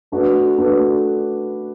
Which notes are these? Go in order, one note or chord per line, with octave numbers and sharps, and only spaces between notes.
A3 D4 F#4 B4
A3 D4 F#4 B4